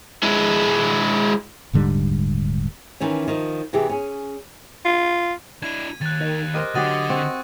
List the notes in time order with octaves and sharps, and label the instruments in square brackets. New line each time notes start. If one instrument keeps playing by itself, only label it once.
[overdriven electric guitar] G#3 E4
[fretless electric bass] D#1 G#2 D3 G3
[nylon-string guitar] D#3 E3 C#4
D#3 F3
C3 E3 G4 G#4
C#4 G#4
[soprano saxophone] F4
[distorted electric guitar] D4 E4 [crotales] G#6 D#7
[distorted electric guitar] D#2 [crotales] F#6 A6
[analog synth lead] D#3
[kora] G4 A#4 C5 [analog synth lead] D#5
[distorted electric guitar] D3 [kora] F#3 G4 [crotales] D#6 A6 D#7
[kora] C4 F#5 [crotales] C#6